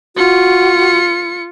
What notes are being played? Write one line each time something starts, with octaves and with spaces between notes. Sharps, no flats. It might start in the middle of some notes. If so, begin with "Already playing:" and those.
F4 F#4 C#7